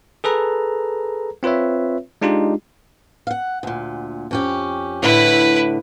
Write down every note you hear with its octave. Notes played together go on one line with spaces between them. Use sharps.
G#4 A4 B4 A#5
C4 F4 B4 C#5 E5
G#3 D4 D#4 F4 G4
F5 F#5
D2 A#2
F2 C#4 G4
A2 D3 E4 B4